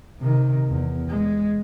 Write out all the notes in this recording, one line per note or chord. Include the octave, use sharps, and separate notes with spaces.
C3 D#3
E2
G#3